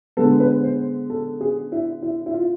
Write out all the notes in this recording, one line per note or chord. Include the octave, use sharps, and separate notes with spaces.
D3 G#3 B3 A4
B4
C5
A4
G#4
E4
E4
E4
F4